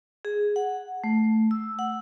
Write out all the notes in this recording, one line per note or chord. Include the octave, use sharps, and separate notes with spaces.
G#4
F#5
A3
E6
F#5